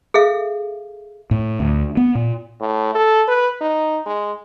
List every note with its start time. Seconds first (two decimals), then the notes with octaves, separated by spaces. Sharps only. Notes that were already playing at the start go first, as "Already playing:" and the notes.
0.14 G#4 A4 E5 F5
1.31 A2
1.60 D2
1.97 B3
2.15 A#2
2.61 A2
2.95 A4
3.28 B4
3.61 D#4
4.06 G#3